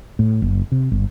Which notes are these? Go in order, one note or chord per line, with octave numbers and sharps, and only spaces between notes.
A2
F#1
C3
G1